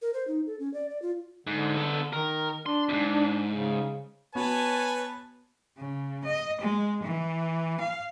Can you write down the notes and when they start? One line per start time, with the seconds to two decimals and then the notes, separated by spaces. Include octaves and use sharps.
0.02 A#4
0.14 C5
0.28 D#4
0.46 A4
0.60 C#4
0.74 D5
0.89 D5
1.02 F4
1.47 G#2 D3
1.76 B3 A4
2.13 D#3 A#4
2.66 D4 C6
2.89 F2 G#2
3.51 C#3
4.35 B3 F#4 B4 C#5 G#5 A5
5.78 C#3
6.24 D#5
6.61 G#3
7.03 E3
7.80 F5